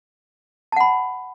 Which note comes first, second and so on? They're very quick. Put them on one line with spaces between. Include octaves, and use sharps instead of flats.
A5 F#5 B5